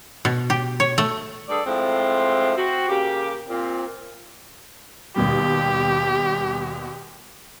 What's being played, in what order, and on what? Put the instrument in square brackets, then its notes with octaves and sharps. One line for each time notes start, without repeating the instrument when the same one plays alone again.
[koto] B2
G4
C#5
A3
[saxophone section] G2 G#4 A4 D5
A2 F3 G#3 C4
C4 F#4
C#3 A#3 G4
A#2 C4
[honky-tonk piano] D#2 B2 G3 [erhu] G4